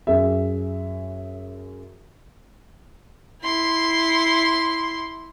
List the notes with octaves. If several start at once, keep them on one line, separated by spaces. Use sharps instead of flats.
F#2 G#4 E5
E4 C6